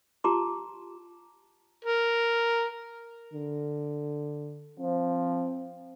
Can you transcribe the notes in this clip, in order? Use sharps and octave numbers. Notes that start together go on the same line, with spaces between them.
F4 G4 A5 A#5 C6 D6
A#4
D3
F3 C4